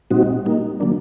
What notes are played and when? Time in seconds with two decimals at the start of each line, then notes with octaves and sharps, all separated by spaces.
0.11 A#2 G3 C4 D#4 F#4
0.45 G3 A#3 D#4
0.80 D3 F#3 A#3 D4